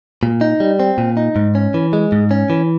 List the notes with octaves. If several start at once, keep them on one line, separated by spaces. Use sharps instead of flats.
A#2
D#4
G3
C4
A#2
D#4
G#2
C#4
E3
G#3
G#2
C#4
E3